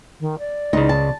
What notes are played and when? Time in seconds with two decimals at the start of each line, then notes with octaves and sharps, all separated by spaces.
0.20 D#3
0.39 D5
0.73 C#2 C#3 D#4
0.89 A5